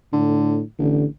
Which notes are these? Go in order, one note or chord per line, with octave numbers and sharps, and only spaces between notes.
A2 D3
A1 D3